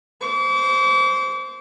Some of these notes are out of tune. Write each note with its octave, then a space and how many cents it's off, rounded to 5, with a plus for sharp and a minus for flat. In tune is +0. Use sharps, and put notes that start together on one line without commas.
C5 +0 D6 -40